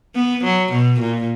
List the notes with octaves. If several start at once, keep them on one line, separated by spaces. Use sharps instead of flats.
B3
F#3
B2
A#2